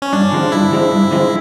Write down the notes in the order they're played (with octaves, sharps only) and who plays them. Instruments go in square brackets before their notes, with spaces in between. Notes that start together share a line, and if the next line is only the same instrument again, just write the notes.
[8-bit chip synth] C#4
[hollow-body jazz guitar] G2 [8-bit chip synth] D4
[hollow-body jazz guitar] D3 F3 G#3 C4
[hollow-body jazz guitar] G2 [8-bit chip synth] E4
[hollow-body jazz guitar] D3 F3 G#3 C4
G2
D3 F3 G#3 C4